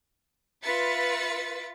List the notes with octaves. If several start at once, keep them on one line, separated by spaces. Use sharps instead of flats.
F4 B4 E5 A6 B6 C#7